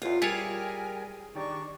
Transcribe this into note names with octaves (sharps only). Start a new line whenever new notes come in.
A1 E2 F4
G3 E4 F4 G#4 A#4 C#5 G5 G#5
D#3 D4 G4 D5 A#5 C#6